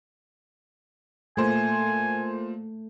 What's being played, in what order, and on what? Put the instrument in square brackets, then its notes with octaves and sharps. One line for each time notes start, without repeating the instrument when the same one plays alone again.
[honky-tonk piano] A#2 C5 [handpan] A3 [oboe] G#5